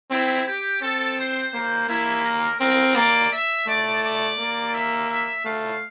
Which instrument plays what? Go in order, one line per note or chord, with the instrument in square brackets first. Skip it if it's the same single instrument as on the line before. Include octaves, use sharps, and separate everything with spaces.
[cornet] C4 [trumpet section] E4
[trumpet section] G4
[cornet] C4 [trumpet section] A4
[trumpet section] C5
[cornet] A#3 [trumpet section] C5
[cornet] A#3 [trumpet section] E4
[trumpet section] A#4
[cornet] C4 [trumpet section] A#4
[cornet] A#3 [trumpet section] D5
[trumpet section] E5
[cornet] A3 [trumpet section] D5
[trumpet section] D5
[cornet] A#3
[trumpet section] E5
E5
[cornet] A3 [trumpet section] F5